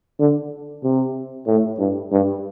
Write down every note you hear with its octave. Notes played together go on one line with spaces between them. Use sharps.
D3
C3
A2
G2
G2